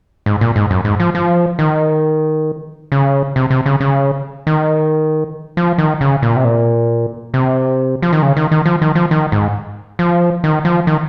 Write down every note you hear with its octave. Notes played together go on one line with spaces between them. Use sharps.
G#2
A#2
G#2
F#2
G#2
F3
F3
D#3
C#3
C3
C3
C#3
C#3
D#3
F3
D#3
C#3
A#2
C3
A#2
C3
F3
D#3
C#3
D#3
D#3
F3
D#3
F3
D#3
G#2
F3
D#3
F3
D#3